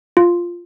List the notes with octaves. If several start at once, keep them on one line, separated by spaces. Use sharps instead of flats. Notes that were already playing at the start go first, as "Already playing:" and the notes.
F4